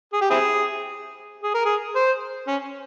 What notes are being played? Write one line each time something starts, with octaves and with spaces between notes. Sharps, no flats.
G#4
G4
C4 E4 G#4
G#4
A#4
G#4
C5
C#4